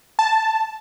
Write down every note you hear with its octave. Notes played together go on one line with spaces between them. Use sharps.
A5